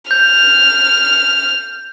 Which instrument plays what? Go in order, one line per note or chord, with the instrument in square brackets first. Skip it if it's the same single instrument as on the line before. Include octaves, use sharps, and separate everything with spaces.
[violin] F6 [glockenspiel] G6